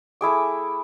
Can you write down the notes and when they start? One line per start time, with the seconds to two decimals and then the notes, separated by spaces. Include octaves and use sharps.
0.21 A3 E4 G#4 D6